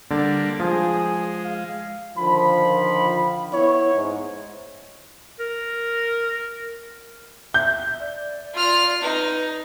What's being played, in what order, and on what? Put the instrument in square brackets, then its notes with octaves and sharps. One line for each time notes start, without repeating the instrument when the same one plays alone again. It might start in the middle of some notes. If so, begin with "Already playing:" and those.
[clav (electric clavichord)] D3 [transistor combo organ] G3 A#3 D4
[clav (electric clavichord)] F3 [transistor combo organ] G#3 [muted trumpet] G#4
[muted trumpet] F5
[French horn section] D3 D#3 F3 [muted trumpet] B5
[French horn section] B3 E4 [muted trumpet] C#5
[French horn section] G#2
[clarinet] A#4
[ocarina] E5 [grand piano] G6
[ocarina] D5
[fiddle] F4 F6
[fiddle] D#4 [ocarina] B4